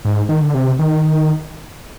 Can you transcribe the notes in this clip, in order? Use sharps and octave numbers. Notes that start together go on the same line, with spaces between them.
G#2
D#3
D3
C3
D#3